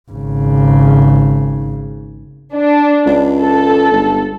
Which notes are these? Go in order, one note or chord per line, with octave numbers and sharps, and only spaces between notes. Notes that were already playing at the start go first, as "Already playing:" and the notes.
G#1 C#3
D4
C#2
A4
G1